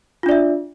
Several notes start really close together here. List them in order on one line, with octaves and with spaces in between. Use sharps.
F4 D4 D5 E5